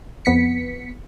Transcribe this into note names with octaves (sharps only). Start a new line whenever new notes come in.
F2 B3 B6 C#7